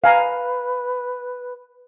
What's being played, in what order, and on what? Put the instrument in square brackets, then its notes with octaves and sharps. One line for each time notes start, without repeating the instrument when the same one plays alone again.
[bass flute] B4 [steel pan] F5 G#5 A#5